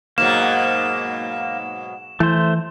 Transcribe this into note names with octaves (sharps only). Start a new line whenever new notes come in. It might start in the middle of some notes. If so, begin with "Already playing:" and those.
G#2 B2 F#3 A#3 E7
E3 A3 C5